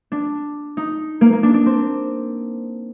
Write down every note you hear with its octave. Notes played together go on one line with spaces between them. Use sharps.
D4
D#4
A#3
A#3
D4
D4
C4